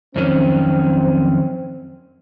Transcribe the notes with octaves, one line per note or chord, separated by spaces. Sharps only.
F2 D#3 F#3 C4 C#4